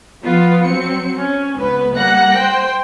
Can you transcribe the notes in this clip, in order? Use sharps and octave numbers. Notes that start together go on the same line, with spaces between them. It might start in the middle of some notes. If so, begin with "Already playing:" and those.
F3 B3 F4
F#3 C4 C#7
C#4
C#2 B3 B4
G3 A#3 F#5 F#6 A#6
C5 G5